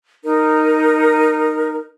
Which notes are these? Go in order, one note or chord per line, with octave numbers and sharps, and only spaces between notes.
D#4 A#4